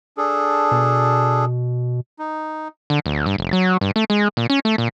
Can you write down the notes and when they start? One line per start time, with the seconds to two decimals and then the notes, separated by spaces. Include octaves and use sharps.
0.18 D4 G#4 A4
0.72 B2
2.19 D#4
2.90 D3
3.06 D2
3.26 G2
3.38 F1
3.53 F#3
3.81 G2
3.96 A3
4.10 G#3
4.37 A#2
4.50 C#4
4.65 A3
4.78 A#2